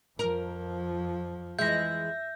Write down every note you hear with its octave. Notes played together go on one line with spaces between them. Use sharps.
F2 F3 A#4
E3 G#3 E5 G6 A#6